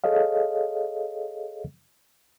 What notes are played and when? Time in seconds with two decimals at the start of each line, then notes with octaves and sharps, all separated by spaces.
0.04 G#4 A4 C#5 D#5 F5